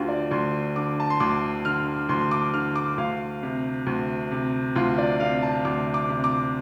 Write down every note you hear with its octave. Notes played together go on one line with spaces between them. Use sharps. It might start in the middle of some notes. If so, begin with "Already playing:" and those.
Already playing: D2 D3 F4 G4
D5
D2 C6
D3 D6
A5
C6
D2 D6
D3 F6
D2 C6
D6
D3 F6
D6
D2 F5
C3
D2
C3
D2 F4
D5
C3 F5
A5
D2 D6
D6
C3
D6